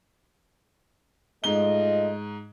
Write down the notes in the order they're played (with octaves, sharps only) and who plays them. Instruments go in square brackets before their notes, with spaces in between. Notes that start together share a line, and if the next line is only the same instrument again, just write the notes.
[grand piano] G#2 G7 [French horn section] A3 F4 D#5